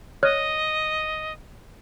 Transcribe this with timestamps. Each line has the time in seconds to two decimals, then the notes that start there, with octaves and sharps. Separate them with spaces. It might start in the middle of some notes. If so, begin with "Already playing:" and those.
0.23 C#5 D#5 F6 F#6